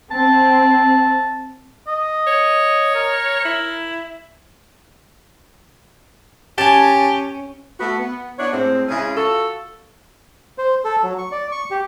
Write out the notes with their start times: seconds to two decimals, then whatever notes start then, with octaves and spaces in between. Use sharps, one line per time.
0.11 C4 A5
1.88 D#5
2.27 C#5
2.95 A#4
3.45 E4
6.58 C#4 G4 G#5 A5
7.79 A3 B3 F#4
7.99 B3
8.38 B3 D4 E4 C#5
8.53 A2 G#3 C4
8.88 C#3 G#3 C#4 E4 G#4
9.16 F4 F#4 A4
10.58 C5
10.84 A4
11.03 F#3
11.18 C#6
11.32 D5
11.51 C#6
11.71 G4